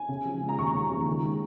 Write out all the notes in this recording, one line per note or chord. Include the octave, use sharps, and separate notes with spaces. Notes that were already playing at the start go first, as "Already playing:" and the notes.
Already playing: G#5
C#3
F3
G#3
A#5
D#2 C#6
C#3
F3
D#3
G#3